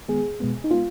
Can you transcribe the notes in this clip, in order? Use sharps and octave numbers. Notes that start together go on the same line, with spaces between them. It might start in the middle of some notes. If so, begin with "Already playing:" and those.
D#3 G#3 B3 G#4
B2 G#3 B3
D#4
G#3 B3 F4